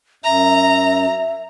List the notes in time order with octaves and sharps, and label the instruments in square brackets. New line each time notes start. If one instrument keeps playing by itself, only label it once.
[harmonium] F#2 [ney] E5 [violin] A#5